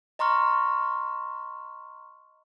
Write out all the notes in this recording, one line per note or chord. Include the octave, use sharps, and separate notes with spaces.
D#5 A#5 C6 C#6 F6